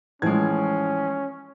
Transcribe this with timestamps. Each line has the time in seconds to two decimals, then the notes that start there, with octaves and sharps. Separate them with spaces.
0.22 A2 E3 F3 G#3 C#4 G#6